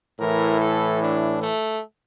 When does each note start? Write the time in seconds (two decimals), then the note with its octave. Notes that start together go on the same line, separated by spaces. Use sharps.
0.20 A2 E3 A#4
0.60 A4
1.00 D4
1.40 A3